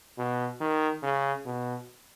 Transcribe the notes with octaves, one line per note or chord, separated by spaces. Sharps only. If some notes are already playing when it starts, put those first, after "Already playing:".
B2
D#3
C#3
B2